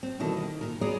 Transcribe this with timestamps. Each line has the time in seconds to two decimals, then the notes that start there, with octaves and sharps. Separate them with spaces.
0.03 C4
0.20 B2 D#3 E3 G3 A4
0.37 D#3
0.61 A#2 A#4
0.81 B3 G#4 C#5 D5 A#5